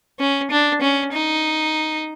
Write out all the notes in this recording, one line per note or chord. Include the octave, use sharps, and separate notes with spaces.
C#4
D4
C#4
D#4